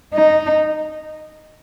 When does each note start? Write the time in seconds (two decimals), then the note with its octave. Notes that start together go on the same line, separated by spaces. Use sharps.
0.14 D#4